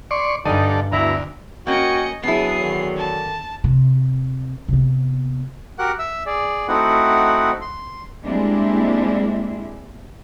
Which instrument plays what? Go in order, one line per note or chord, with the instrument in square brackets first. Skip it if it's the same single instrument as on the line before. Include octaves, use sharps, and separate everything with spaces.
[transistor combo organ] D5 C6 C#6
[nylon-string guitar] G2 G#5 [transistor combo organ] D3 A4 [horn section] G3 D#4
[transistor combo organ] D2 [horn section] B2 E4 A#5
[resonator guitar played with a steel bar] A#3 C#4 [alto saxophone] F#4 [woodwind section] A#4 G5 G#5 [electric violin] D#5 C#7
[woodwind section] C#3 D4 D#6 [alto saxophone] F#3 [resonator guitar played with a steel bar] B3 E4 [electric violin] G#4 C7
[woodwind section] D3 D#3
[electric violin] A5
[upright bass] C3
C3 B3
[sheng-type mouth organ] F#4 G4 A#4 F#5 F#6
E5 E6
G#4 D5
A3 C4 D#4 E4 F#4 F#5
C6
[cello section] G3 G#3 A#3 C4 D4 E4